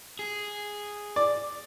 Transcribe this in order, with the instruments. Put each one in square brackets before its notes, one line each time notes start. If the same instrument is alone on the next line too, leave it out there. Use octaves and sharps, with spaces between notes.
[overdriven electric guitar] G#4
[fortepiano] D5